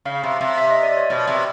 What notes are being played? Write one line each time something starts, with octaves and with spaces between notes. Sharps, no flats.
C#3 F5
C3
C3
E5
D#5
D5
C#5
B2 D5
C3